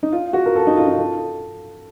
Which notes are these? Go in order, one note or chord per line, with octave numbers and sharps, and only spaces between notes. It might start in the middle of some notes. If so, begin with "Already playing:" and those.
D#4
F4
F#4
A#4
A4
D#4
F4
D#4
A4